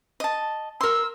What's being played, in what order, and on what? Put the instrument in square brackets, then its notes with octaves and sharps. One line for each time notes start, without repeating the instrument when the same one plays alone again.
[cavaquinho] D#5 A5
[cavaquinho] A#4 C6 [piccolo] E6